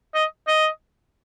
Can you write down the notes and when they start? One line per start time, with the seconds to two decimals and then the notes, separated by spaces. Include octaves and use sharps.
0.14 D#5
0.47 D#5